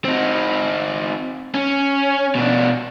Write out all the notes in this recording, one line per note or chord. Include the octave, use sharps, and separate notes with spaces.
C4 D#4
C#4
B2 D4